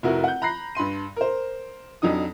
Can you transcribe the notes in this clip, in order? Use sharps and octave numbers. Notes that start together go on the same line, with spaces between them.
F1 E4 F#4 A#4
F#5 G6
A#5 B5 F#6 A#6 C7
G2 B5 C6 D#7
A#4 C5
F2 F#3 D4 D#4 D#6